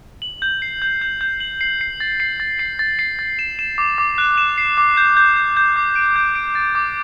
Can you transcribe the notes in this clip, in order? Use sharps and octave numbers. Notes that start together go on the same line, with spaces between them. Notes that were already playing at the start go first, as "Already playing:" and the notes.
F#7
G6
C7
G6
G6
G6
F#7
C7
C7
A6
C7
A6
C7
A6
C7
A6
E7
E7
D6
D6
F#6
E7
C7
D6
G6
G6
G6
G6
D6
D7
G6
D7
A6
D6